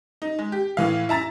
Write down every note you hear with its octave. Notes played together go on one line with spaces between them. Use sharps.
D#4
G#3
G4
A2 E3 F5
E4 A5 A#5 A6